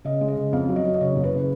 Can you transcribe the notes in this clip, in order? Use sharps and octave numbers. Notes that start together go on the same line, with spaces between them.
C#3 D#5
G#3
D#5
C#3
F2 F5
F#3
D#5
F#3
D#5
C#3 C#5
F#1
B4
C#3